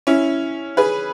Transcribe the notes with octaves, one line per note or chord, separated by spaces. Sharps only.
C#4 E4
G#4 B4